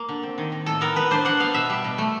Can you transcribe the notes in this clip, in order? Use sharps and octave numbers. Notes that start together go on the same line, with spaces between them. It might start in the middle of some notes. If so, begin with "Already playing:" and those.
Already playing: A#3
D3
C4
D#3
D#3
A2 A4
B3 A#4
B3 B4
D4 C5
D4 F#5
B3 F5
B2 E5
G3
B2
A3